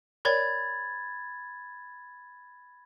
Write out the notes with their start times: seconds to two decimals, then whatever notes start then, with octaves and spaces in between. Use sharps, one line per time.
0.25 A#4 C#5 D5 B5 G#6 A6